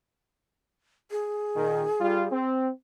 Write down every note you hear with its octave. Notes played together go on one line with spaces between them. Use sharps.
G#4
A#2 D#3
G3 F4
C4